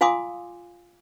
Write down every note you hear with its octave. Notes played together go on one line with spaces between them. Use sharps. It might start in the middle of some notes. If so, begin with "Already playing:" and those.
F4 F5 G#5 C6 D6 D#6